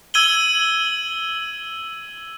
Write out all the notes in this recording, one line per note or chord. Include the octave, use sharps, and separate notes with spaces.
E6 G#6 D#7 F#7 G7